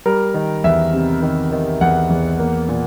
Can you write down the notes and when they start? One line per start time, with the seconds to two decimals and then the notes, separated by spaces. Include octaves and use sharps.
0.06 G3 A#4
0.34 D#3
0.64 E2 E5
0.93 C3
1.22 D#3
1.52 D#3
1.81 E2 F#5
2.10 E2
2.39 A#3
2.69 A#2